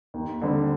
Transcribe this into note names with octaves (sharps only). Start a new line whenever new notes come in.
D#2
D3 G3 C4